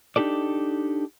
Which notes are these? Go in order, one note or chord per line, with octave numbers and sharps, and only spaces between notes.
D4 D#4 G4 A4 D5